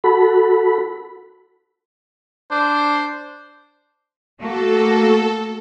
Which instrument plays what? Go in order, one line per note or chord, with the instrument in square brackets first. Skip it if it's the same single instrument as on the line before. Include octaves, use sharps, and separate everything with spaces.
[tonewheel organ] F#4 A4 B5
[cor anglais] D4 [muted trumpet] C5
[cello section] A3 A#3 F#4 [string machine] A4